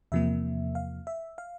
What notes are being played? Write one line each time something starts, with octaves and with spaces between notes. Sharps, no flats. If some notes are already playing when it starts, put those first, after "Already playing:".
E2 C3 F3 A#3 E5
F5
E5
F5